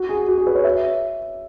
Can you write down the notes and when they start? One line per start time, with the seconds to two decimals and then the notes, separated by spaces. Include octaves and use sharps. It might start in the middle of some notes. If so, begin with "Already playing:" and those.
Already playing: F#4
0.09 G#4
0.28 F#4
0.38 G#4
0.47 B4
0.55 C#5
0.64 E5